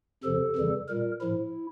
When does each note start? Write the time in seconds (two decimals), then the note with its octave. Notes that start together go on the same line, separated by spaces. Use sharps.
0.24 F2 C3 F3 A4
0.56 F2 C#3 E3 G3
0.88 A#2 G3 A#4
1.21 A2 F3 E4